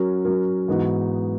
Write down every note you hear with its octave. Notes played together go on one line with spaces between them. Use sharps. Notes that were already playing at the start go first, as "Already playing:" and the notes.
Already playing: F#3 C#4 F#4 A#4
F#3 C#4 F#4 A#4
G#2 E3 B3 D#4 F#4